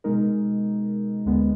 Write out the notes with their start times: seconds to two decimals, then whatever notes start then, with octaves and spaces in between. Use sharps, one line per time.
0.04 B2 G#3 D#4 A#4
1.26 D2 D3 G#3 B3